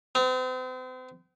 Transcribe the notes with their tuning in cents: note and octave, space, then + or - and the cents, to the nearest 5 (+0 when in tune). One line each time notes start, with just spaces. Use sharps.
C4 -40